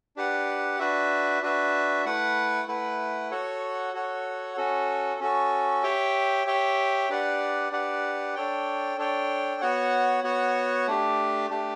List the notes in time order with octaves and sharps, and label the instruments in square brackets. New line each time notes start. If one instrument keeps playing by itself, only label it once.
[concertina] D4 G4 B4 F#5
D4 F#4 B4 E5
D4 F#4 B4 E5
A3 E4 B4 F#5
A3 E4 B4 F#5
F#4 A4 C#5 F#5
F#4 A4 C#5 F#5
C#4 F#4 A4
C#4 F#4 A4
G4 C#5 E5 G5
G4 C#5 E5 G5
D4 G4 B4 D5 F#5
D4 G4 B4 D5 F#5
D4 A4 C#5 G5
D4 A4 C#5 G5
B3 F#4 C#5 F#5
B3 F#4 C#5 F#5
A3 D4 G4
A3 D4 G4